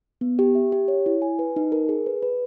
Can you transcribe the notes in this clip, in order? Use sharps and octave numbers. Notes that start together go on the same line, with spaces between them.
B3
G4
E5
G4
C#5
E4
G#5
B4
D#4
A#4
G#4
B4
B4